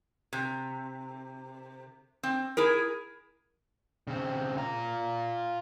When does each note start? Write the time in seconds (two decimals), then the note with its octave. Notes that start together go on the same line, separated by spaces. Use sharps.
0.33 C3
2.23 C4
2.57 E4 G#4 A#4
4.08 C#3 C4
4.57 F4 A#5